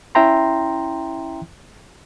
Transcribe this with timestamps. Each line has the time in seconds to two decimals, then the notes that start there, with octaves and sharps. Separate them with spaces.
0.15 C#4 E4 E5 G5 A#5 C6